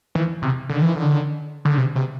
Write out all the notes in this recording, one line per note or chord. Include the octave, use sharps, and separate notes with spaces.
E3
C3
D3
E3
D3
D3
C3
C3